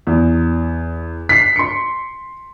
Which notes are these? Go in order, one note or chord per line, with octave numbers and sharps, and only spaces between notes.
E2
B6 C7
C6 C#7